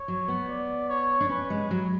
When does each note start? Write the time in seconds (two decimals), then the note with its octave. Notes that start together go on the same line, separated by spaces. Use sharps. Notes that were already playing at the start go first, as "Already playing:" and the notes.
Already playing: C#5
0.08 F#3
0.28 B3
0.48 D5
0.89 C#5
1.21 D4
1.29 C#4 B4
1.50 G#3
1.71 F#3